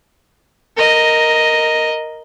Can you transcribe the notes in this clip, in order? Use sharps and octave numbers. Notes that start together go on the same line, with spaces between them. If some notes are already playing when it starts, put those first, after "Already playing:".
A#4 D#5